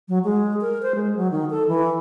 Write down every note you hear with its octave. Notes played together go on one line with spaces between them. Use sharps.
F#3
G#3
A#4
C5
G#3
F#3
D#3
A4
E3